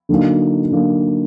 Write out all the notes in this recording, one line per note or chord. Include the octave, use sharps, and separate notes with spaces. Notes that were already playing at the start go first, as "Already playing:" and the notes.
D3 F#3 A#3 D#4
D3 F#3 A#3 D#4